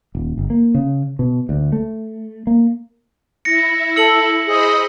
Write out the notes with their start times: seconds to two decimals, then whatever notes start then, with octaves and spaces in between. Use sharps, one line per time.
0.15 D#1
0.37 G1
0.50 A#3
0.75 C#3
1.19 B2
1.49 D2
1.72 A3
2.47 A#3
3.45 E4 A#6 C#7
3.96 A4 E6 C#7 F#7
4.46 G#4 C5 D#5 B5